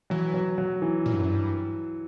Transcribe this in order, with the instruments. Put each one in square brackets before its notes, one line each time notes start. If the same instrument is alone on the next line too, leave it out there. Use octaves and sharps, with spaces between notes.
[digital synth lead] E3 [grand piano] F#3
[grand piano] F#3
F#3
E3
[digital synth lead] A#2
G2
F#2
G2